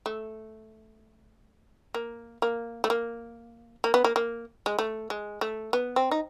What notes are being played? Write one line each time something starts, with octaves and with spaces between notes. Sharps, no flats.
A3
A#3
A#3
A3
A#3
A#3
B3
A#3
A#3
G#3
A3
G#3
A3
B3
C4
D#4